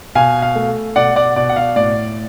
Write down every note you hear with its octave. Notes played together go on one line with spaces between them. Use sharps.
B2 F5 G#5
F5
A3
B2 D5 F#5
D5 F#5
B2 D5
F#5
F5
A2 D5